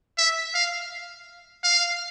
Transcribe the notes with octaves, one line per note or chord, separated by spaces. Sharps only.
E5
F5
F5